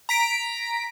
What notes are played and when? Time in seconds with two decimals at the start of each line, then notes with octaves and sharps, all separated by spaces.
0.09 A#5 B6 D7